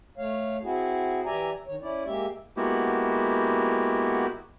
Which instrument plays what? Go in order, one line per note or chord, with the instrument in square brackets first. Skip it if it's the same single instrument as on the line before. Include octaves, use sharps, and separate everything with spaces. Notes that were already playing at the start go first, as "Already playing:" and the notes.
[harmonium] A3 C#5 F5
C4 E4 F#4 G#4
E3 G4 D5 E5 G#5 A#5
D#3 C#5
C#4 E4 D5
G#3 A#3 G4 E5
[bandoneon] G#3 A#3 B3 E4 F#4 G4